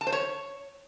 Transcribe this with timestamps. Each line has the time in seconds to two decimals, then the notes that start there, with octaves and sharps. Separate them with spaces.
0.01 A5
0.07 C5
0.12 C#5